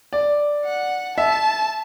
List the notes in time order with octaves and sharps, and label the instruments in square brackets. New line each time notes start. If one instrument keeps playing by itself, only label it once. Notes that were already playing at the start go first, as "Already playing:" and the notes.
[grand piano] D5
[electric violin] F#5
[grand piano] E5 [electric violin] A5